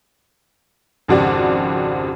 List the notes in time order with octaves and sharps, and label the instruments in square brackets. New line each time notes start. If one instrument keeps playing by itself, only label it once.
[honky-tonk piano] G#1 F2 C#3 F#4 G4 D5